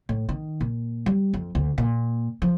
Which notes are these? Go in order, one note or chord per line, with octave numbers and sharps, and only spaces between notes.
A2
D#3
A#2
G3
F2
D2
A#2
F3